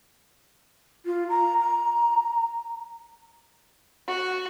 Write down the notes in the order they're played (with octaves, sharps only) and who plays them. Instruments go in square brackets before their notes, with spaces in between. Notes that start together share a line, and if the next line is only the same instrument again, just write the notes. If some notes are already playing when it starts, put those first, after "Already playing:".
[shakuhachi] F4
A#5
A#5
[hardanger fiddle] F#4